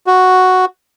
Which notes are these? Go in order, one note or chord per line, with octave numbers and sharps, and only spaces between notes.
F#4